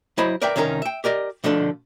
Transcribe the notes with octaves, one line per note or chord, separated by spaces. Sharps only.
F#3 E4 C5 D#5 B5
A#4 B4 D5 E5 G5
C2 D#3 C#4 D#4 G#4 A#4
E5 G5
G4 A#4 D5 D#5
B2 D3 F3 A3 D4 A4